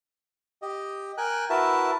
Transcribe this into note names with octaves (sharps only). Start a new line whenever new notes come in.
G4 D#5
A#4 G5 G#5 F#6
E4 F#4 A#4 B4 E5 A5